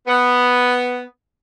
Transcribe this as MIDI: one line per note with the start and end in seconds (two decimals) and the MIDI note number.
0.08 1.00 59